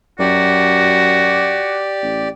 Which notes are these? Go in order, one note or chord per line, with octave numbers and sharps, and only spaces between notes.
F#2 F#4 G4 D5
A1